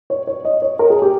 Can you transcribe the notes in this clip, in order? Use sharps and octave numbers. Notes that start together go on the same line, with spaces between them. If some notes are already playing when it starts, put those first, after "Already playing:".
C#5
C#5
D#5
C#5
A#4
G#4
G4